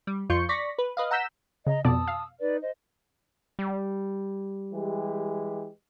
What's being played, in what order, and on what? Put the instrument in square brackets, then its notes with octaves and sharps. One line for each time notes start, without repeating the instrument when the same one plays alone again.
[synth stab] G3
F2 F4 C6 C#6 G6 C#7
D5 C#6 A#6 B6
B4
B4 D#5 F5
F#5 A#5 E6 G6 B6 E7
[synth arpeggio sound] C#3 [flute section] D#5 A#5
[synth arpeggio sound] F2 B2 D5 [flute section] A5 D#6 E6
[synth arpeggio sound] F5
[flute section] D#4 B4 D5
C5 D#5
[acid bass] G3
[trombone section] E3 G#3 G4